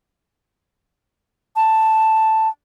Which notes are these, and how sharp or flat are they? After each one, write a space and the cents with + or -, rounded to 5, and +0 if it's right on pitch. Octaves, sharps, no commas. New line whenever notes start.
A5 +0